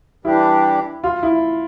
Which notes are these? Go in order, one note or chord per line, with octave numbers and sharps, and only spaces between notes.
E3 G3 D4 E4 G4
F4
E4